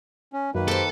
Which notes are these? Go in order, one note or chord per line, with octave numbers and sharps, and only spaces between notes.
C#4
F#2 D#3 A#3 B4
G4 A4 C5